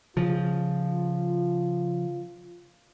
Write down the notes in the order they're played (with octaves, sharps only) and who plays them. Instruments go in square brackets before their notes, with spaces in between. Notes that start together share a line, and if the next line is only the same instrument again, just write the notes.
[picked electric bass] C#3 F3 [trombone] F4